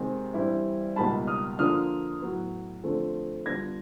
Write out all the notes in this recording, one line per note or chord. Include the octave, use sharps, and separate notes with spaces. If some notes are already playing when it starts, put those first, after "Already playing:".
Already playing: C3 D#3 G#3 C4
G2 E3 G3 C4 E4
C#2 B2 G3 A#3 D#4 A5 B5
D#6 F6
D3 F3 A#3 D4 F4 D#6 F6
A2 F#3 B3
D3 F3 A3 C4
D3 G3 B3 D4 F4 G#6 A#6